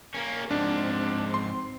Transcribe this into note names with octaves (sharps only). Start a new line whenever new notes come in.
A#3 C#4 A#4
G#2 F3 C4 D4
C6